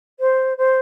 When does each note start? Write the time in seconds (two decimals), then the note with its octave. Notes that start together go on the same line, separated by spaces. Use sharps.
0.20 C5
0.57 C5